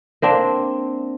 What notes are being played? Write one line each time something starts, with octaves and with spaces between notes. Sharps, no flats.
A#3 C4 D4